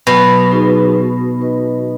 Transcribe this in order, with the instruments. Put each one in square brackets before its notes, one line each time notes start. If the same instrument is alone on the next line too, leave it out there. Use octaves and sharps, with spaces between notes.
[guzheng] B2 [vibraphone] F#3
[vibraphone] D#4 G#4 B4
B3
D#4 B4 D#5